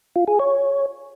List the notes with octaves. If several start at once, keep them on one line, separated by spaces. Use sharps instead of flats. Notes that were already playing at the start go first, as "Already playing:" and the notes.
F4
G#4
C#5